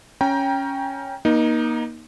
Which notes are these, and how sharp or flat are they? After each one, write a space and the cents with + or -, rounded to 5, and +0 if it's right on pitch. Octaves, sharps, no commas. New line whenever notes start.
C#4 +0 G5 +5 A#5 +25
A#3 +35 D#4 +0